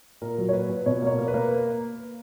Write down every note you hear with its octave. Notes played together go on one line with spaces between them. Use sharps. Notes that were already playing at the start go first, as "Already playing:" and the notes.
A#2 A#4
F#3
C#5
A#2 B4
A#2
B2 C#5
A#3 C#5
A#3
B4
A#3